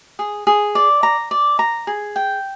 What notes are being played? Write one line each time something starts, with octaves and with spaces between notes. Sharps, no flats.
G#4
G#4
D5
A#5
D5
A#5
G#4
G5